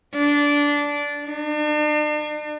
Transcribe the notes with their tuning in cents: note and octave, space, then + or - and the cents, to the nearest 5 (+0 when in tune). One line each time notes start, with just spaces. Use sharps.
D4 -15
D4 +40